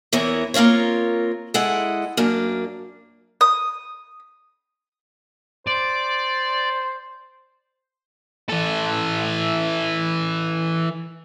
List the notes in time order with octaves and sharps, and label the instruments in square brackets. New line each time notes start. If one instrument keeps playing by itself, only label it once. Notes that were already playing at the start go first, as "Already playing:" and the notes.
[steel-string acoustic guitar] E2 E3 B3 E4 A#4 C#5
A#3 C4 F4 A#4 C#5
G#3 E4 A4 D#5 F#5
F#2 A#3 D4
[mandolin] D#6
[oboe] C5 [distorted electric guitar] D5
[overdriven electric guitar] E3 A4